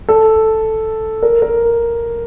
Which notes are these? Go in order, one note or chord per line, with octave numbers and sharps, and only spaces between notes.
A4
A#4
A#4